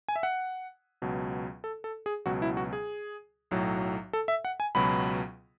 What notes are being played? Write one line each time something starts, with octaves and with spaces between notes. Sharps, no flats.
G#5
E5
F#5
C#2 B2 F#3
A4
A4
G#4
C#2 B2 F#3 F#4
E4
F#4
G#4
B1 A2 F#3
A4
E5
F#5
G#5
C#2 B2 F#3 B5